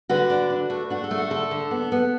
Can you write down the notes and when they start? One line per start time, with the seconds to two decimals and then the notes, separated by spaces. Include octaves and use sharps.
0.09 D3 F#4 B4
0.30 D4
0.50 D4
0.70 A3
0.90 D4 F#4
1.04 A4
1.11 A3
1.18 F#4
1.30 D3 A4
1.51 D3
1.71 B3
1.92 B3